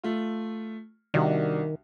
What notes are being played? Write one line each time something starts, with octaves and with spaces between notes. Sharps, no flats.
A3 F4
C2 D#3 D4 F#4